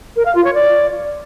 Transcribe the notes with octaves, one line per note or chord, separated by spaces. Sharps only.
A#4
F5
F4
C#5
D5